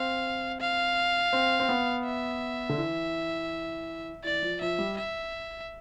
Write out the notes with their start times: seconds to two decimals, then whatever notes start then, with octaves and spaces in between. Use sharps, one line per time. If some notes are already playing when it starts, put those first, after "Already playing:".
Already playing: C4 F5
0.60 F5
1.33 C4
1.60 C4
1.69 B3
2.05 E5
2.69 D3
2.78 E3
4.24 E3 D5
4.43 F3
4.61 F3 E5
4.79 G3
4.97 E5